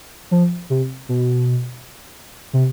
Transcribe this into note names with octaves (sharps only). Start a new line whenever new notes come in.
F3
C3
B2
C3